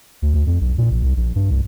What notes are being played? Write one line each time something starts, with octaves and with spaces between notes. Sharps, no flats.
D2
D2
F2
B1
A#2
A#1
C2
A#1
G2
C2